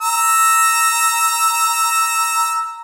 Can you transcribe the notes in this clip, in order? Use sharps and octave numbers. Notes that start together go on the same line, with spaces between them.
A#5 E6